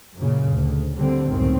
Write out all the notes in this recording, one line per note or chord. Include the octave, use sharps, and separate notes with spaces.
F#2 A#2 C#3
D2
D3 G3 C4
G1 C#2 F#2 A2 D#3 C4